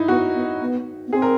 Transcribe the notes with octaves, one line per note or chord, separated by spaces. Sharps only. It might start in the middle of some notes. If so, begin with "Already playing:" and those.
Already playing: D#4 E4
B3 F#4
B3
B3
B3
C4 G#4
A#4